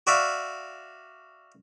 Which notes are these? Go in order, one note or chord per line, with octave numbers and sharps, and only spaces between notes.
F#4 D5 E5 F5